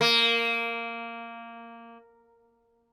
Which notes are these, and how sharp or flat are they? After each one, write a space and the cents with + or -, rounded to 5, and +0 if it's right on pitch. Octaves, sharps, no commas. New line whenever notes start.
A#3 -10